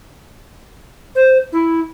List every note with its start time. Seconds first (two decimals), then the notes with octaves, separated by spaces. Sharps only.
1.15 C5
1.52 E4